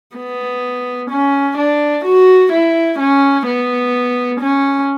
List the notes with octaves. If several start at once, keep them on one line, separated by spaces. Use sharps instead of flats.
B3
C#4
D4
F#4
E4
C#4
B3
C#4